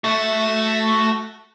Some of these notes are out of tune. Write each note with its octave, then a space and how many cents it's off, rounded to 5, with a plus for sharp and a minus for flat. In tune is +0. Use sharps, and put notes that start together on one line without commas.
A3 -5 F#4 +0